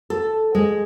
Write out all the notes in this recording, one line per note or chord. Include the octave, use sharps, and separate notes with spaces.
A4
G#3